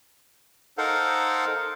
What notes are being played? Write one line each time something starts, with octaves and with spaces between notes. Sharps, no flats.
D#4 A4 A#4 C5 F5 F#5